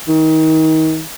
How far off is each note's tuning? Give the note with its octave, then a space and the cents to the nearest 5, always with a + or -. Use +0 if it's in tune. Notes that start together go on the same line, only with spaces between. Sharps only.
D#3 +30